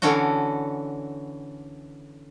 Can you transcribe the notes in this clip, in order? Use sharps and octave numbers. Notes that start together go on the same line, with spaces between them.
D3 E3 C#4 D4 F#4